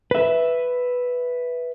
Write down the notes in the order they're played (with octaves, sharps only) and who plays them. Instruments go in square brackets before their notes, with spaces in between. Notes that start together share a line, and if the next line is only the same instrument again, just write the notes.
[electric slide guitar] B4 E5